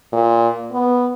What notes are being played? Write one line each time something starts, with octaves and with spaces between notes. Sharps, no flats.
A#2
B3